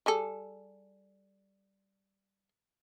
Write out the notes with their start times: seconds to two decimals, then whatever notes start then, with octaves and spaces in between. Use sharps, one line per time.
0.06 G3 G#4 A4